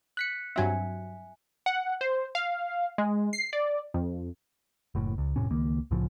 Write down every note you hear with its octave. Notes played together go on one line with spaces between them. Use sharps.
F#6 B6 C#7
G2 F#3 C4 E5 G#5
F#5
C5
F5
G#3
C7
D5
F2
F#1 A2
C#2
F1 A2 C3 C#4
C#2 D#3 A#3
C2 A2 C#3 F3